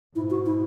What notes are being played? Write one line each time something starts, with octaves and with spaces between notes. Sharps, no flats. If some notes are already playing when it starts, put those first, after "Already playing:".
G#2 B2 E4
F#4
E4